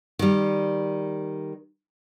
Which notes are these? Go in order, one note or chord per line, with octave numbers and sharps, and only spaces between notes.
D#3 G3